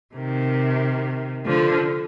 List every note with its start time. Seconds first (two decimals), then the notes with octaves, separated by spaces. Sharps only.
0.16 C3 D#3
1.46 D3 F3